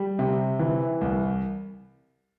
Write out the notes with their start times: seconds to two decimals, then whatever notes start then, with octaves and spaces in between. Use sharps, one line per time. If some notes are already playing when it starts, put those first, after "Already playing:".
Already playing: G3
0.19 C3
0.59 E3
1.01 C2